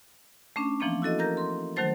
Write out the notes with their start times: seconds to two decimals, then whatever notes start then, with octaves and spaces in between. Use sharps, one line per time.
0.56 A3 C#4 D4
0.80 E3 F3 A#3 C4 D4
1.02 E4 F#4 A4 D#5
1.18 A#4 A#5 G6 A#6
1.37 C6
1.76 D#3 F#3 A3 C5 A6